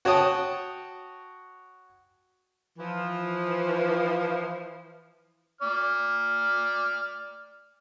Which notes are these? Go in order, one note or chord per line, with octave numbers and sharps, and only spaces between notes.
F#4 C#5 G5 A5 D#6
E3 F3
D5 F6